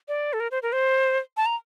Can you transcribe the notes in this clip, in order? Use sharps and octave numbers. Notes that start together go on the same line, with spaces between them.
D5
A4
A#4
C5
A#4
C5
A5
A#5